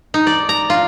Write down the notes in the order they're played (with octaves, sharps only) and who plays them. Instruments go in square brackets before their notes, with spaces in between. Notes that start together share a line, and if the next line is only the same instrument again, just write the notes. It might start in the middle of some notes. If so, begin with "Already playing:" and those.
[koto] D#4
D5
A#5
F4